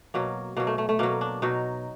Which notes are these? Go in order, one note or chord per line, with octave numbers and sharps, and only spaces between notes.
B2 F#3 A#3
B2 F#3 A#3
A3
A3
A3
B2 F#3 A#3
D4
B2 F#3 D#4